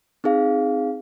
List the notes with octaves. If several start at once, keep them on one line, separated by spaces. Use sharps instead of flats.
C4 D#4 G#4 F5